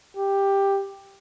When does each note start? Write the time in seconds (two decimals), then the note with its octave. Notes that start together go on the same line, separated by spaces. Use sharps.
0.17 G4